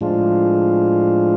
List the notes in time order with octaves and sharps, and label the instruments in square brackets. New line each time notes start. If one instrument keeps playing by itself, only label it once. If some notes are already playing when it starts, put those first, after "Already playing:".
[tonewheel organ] A2 F3 G#3 D4 F4